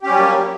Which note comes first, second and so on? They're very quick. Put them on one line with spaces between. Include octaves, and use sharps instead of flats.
G4 C#4 G3 F#3 A#3